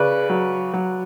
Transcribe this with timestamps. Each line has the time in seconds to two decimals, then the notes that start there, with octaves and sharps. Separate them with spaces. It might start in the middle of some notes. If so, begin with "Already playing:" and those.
Already playing: C#3 B4 D5
0.30 F#3
0.74 F#3